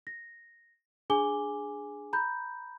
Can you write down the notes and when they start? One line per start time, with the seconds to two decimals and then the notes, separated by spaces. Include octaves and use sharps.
0.07 A#6
1.10 D4 G#4 G#5 D6 G7
2.13 A#5 B5 G6